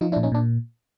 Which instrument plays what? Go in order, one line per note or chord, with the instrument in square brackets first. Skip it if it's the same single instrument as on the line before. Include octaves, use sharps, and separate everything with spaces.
[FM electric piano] F3 D#4 F4
D4 E4
A#2
C#4 D#4
A#2 D4